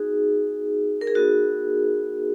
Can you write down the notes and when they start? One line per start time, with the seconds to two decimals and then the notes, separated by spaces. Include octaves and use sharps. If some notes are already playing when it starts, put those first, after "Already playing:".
Already playing: B3 D#4 F#4 G#4
1.01 A#4
1.07 G#4
1.15 B3 D#4 F#4